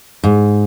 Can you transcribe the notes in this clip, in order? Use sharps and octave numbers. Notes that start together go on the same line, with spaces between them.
G#2